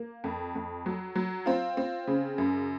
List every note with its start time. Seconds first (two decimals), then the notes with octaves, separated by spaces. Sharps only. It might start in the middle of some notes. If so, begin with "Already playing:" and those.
Already playing: A#3
0.24 F2
0.55 F2
0.86 F#3
1.15 F#3
1.46 C4 F4
1.77 C4
2.07 C#3
2.38 F#2